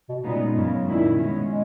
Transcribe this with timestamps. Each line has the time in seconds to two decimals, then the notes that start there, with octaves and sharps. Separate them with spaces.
0.09 B2
0.24 A#2 C#3 G#3 B3 D#4
0.56 F#2 C#3 G#3
0.86 A#2 D#3 A#3 E4
1.17 B2 G#3 C#4
1.49 G#3